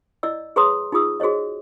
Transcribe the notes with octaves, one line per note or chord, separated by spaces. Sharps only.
E4 D5 D#5 E6
G#4 B4 C#5 A#5 C6 D#6
D#4 F4 G#4 D#6 E6
F#4 G#4 C5 C#5 D#5